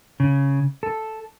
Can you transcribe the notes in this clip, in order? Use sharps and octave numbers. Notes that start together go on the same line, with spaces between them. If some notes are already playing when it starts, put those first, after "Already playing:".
C#3
A4